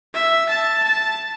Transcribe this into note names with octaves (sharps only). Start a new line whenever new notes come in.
E5
A5
A5